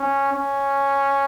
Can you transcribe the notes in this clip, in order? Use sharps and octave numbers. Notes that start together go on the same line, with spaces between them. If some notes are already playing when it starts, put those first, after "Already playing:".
Already playing: C#4
C#4